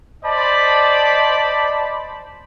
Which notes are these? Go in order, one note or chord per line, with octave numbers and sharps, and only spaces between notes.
C5 D5 D#5 A5 B5 C6